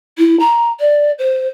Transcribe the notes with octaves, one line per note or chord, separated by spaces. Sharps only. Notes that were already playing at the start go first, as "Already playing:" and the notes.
E4
A#5
D5
C5